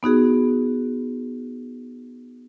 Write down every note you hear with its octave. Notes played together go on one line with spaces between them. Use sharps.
B3 D#4 F#4 G#4